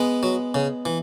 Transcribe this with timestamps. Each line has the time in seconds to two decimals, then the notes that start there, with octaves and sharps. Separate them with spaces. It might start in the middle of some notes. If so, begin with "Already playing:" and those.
Already playing: G#3 B3
0.23 F#3
0.54 C#3
0.85 E3